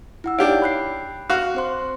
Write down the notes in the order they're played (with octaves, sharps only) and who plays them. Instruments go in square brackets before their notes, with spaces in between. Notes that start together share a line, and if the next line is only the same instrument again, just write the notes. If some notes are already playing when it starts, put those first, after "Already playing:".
[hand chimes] E4 F#5 E6
[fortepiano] D4 G4 F5 [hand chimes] D#4 C#5 D7
[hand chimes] B5 F#6 C7
[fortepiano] F#4 F5
[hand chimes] C4 C5 C6